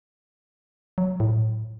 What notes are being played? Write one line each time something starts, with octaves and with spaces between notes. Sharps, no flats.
F#3
A2